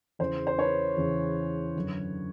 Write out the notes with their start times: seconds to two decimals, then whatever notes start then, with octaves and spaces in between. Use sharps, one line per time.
0.19 E2 C#3 E3 C5
0.47 C5
0.58 B4 C#5
0.97 E2 C#3 E3
1.76 F#2 D3